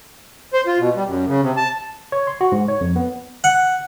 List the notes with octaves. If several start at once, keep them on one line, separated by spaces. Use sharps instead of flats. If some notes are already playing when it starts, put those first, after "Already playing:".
C5
F4
B2
G3
F#2
C#3
C3
A5
C#5
C6
F#4
G#2
C#5
F2
B3
F#5